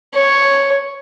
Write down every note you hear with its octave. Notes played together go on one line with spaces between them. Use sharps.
C#5